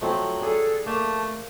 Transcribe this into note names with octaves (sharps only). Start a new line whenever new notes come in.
F3 F#3 A3 C4
D4 G#4 A4
A3 A#3 A5